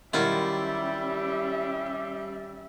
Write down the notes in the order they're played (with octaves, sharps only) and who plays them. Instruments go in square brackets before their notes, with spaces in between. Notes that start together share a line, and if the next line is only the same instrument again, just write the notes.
[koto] D#3 F#3 F4 [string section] G3 [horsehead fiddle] C#4 E5 [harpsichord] E4